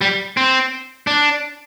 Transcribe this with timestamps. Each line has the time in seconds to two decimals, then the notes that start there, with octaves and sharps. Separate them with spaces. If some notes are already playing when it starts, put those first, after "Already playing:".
0.01 G3
0.37 C4
1.07 D4